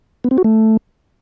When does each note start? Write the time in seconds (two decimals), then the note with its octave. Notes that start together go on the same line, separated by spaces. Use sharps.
0.24 B3
0.31 C4
0.38 F#4
0.44 A3